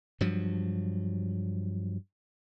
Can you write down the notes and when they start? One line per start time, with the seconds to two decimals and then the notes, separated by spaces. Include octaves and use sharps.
0.21 G2 F3 F#3